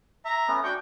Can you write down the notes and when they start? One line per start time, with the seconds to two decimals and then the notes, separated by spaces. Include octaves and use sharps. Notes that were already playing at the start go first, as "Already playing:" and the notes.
0.25 E5 A#5
0.48 A3 B3 C#4
0.64 D4 F#4 G5 C#6